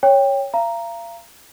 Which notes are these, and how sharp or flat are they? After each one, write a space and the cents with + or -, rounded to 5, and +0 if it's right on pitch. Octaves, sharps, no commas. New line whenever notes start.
C#5 +0 G5 +15
F5 -40 A#5 +0